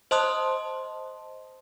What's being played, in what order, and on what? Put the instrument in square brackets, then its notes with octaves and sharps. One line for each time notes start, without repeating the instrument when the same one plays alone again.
[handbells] C5 D#5 A5 C6 D#6 F#6